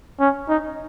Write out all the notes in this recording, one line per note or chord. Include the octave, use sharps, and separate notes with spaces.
C#4
D#4